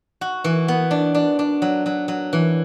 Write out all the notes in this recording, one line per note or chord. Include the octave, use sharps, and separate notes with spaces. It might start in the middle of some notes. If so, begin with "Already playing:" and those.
F#4
E3
B3
D4
D4
D4
F#3
F#3
F#3
E3